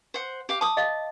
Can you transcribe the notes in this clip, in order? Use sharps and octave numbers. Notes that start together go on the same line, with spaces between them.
C5 F#5
G4 F5 D6
A5 D6 D#6
D#5 F5